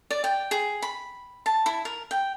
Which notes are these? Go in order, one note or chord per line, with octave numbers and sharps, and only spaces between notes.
D5
G5
G#4
B5
A5
E4
A#4
G5